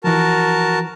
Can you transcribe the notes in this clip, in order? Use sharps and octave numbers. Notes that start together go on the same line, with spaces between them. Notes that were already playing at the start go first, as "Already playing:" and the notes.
E3 F3 F#4 A#4 A5